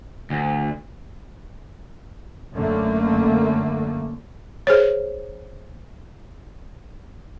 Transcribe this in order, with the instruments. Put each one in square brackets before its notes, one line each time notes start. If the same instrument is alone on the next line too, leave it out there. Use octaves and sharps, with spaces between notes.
[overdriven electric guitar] D2
[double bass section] F#2 D3 A3 A#3
[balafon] G#4 C5 C#5